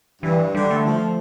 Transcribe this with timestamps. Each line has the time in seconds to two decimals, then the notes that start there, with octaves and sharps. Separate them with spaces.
0.22 G2 E3
0.55 D3 G3
0.70 A3
0.86 F3